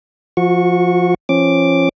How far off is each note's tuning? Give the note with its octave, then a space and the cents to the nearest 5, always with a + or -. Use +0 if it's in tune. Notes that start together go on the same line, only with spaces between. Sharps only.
F3 +0 F#4 -35 C#6 -5
F3 -25 C#4 -30 D6 +0